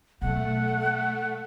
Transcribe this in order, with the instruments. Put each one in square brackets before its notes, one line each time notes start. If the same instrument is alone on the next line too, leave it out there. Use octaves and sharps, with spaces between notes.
[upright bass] B2 F#3 [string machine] A3 [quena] F#5